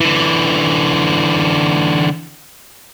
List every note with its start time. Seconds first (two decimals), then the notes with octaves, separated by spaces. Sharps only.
0.01 D3 E3